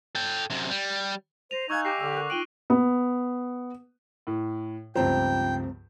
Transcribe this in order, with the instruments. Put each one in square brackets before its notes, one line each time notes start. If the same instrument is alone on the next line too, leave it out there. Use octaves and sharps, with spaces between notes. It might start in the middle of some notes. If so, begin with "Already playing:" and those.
[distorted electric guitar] A4 G5
F#2 C3
G3
[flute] C5 [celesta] A#6 D#7 [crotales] F7
[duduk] D#4 [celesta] D#5 F5 G#5 [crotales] C#6 E6 F#6 [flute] G#6
[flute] G4 [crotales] D6 A#6 C7
[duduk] D3 [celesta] E6 F6
[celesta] A4 A#4 F#6
[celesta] D#4 F4 F#7 [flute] G5 [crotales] D7 D#7 G7
[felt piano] B3
[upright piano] A2
[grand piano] C#2 G2 F3 [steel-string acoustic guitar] A3 C4 A#5 [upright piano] C5 [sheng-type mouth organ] G5